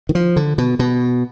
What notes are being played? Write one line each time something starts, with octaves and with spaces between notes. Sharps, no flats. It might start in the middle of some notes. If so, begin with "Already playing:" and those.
D#3
F3
D3
B2
B2